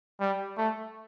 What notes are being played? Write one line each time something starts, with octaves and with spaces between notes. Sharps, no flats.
G3
A3